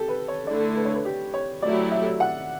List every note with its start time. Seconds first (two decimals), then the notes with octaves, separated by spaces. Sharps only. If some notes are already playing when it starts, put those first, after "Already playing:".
Already playing: G4 A4
0.08 B4
0.28 C#5
0.47 D3 A3 E4 D5
0.76 B4
0.85 C#5
0.94 B4
1.05 G4
1.34 C#5
1.62 F#3 A3 E4 G4 D5
1.92 E5
2.20 F#5